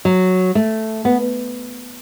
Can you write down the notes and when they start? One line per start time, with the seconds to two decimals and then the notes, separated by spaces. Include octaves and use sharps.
0.05 F#3
0.55 A3
1.05 B3